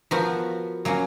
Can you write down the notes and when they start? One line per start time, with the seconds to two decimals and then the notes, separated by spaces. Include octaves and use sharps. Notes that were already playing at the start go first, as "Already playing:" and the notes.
0.11 F3 B3 F#4 A#4
0.85 F#3 A#3 C#4